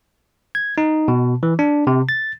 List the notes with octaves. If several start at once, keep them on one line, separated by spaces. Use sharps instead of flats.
G#6
D#4
B2
E3
D4
C3
A6